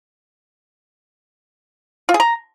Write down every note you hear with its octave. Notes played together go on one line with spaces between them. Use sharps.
F4
G#4
A#5